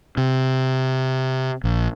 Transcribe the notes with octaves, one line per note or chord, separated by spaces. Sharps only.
C3
A#1